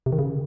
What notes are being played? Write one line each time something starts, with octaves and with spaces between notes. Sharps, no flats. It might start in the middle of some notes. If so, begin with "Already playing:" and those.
C3
D#3
C#3